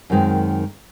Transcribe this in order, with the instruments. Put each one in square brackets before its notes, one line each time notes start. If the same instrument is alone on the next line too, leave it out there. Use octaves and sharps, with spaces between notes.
[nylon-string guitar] F#2 D#3 G#3 C4